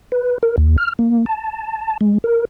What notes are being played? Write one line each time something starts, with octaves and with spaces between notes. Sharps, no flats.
B4
A#4
D#2
F6
A#3
A5
G#3
A#4